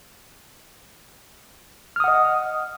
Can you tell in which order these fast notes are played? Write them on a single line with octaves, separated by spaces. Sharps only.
F6 D#6 F#5 D#5